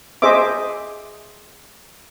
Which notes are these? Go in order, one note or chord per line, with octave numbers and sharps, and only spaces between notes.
G#4 C5 D#5 E5 D6